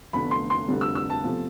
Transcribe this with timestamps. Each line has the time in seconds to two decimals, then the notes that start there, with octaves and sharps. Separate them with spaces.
0.13 F1 E2 D3 A3 B5
0.31 C6
0.50 C6
0.68 F1 F2 D3 G3
0.81 E6
0.95 E6
1.10 A5
1.23 E2 C3 F3 A3